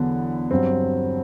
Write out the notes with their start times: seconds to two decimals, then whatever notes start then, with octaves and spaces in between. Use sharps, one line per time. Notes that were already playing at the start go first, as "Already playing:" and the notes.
Already playing: E2 D3 F#3 B3
0.51 G2 F#3 C4